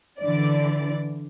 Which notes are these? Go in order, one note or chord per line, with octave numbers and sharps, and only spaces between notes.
D3 E3 D5